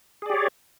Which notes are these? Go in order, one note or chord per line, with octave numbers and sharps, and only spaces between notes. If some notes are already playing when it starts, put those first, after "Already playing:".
G4 G#4 C#5 D5